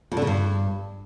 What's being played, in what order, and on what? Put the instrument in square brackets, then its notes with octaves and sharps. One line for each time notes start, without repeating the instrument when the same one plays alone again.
[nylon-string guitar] F2
D3
C#3
G2